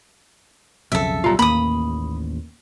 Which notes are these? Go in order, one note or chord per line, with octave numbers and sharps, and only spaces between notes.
B1 F2 C#3 A4 E5
D1 B1 G3 F4 A#5
A1 D#2 A#3 B5 D#6